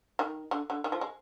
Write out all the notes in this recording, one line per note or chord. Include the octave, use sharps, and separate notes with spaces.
D#3
D3
D3
D#3
F3
G#3